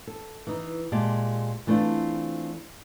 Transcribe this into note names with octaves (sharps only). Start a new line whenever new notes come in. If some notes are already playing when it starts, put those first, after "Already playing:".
A4
E3 D#4
A#2 G#3 G4 A5
E3 A3 C4 D4 F4